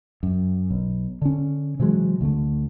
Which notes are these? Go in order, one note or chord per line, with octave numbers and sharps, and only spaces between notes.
F#2
B1
D3 C#4
C3 E3 F#3 G#3
D2 D3 A3